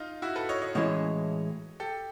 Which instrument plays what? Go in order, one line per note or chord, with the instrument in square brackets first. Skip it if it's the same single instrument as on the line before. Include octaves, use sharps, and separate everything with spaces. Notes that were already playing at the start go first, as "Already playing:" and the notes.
Already playing: [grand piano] D#4 F4
E4 F#4
A4 B4
C#5 D#5
C#5 D#5
[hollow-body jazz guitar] A2 E3 G#3 C#4 E4 [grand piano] C#5 D#5
[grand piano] G4 A4